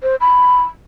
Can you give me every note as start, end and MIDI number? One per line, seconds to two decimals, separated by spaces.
0.03 0.16 72
0.21 0.62 83